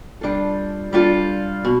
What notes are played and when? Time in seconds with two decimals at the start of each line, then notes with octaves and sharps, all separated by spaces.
0.21 G3 D4 F4 A4
0.93 G3 D4 F4 A4
1.65 B2